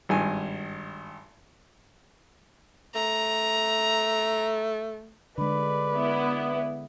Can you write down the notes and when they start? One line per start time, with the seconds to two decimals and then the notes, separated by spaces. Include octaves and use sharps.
0.09 G#1 G2 G#5
2.95 A3 A#5
5.38 D3 G#3 B4 D5 B5
5.94 B3 E4